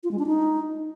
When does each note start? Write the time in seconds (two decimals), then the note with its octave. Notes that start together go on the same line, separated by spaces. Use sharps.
0.04 F4
0.11 G#3
0.19 D4
0.27 D#4